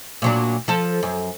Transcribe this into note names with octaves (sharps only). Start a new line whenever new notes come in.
A#2 F#3 D4
F3 A4
F#2